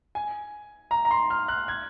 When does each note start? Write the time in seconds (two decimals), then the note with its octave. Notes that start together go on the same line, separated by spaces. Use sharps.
0.15 G#5
0.91 A#5
1.05 A#5
1.11 C6
1.30 F6
1.48 F#6
1.68 G#6